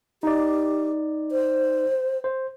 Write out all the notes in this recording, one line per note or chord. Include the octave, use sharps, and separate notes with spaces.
D#4 G4 D5
C5
C5